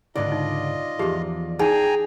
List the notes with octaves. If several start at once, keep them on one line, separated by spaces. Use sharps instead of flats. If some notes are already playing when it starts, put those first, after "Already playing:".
C#2 G#2 D3 F4 D5 D#5
D#4
E2 F3 G4 G#4
D#4 G#4 G5 G#5 A#5